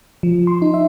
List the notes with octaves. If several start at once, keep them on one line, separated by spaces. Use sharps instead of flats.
F3
C6
D#4
E5